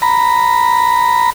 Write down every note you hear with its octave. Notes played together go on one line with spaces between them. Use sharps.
A#5 B5